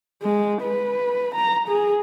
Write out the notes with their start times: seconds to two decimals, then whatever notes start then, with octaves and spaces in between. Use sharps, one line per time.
0.22 G#3
0.62 B4
1.35 A#5
1.69 G#4